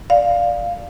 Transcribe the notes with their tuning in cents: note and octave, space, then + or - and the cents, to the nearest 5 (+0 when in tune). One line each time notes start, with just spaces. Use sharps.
D5 +0 F5 +0